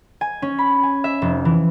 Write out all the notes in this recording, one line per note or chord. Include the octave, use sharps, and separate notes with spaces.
G#5
C#4
B5
G#5
E5
F1
E3